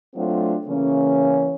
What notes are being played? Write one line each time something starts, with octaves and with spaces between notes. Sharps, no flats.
F#3 A3 C4 D4 F4 F#4
C#3 E3 A#3 C#4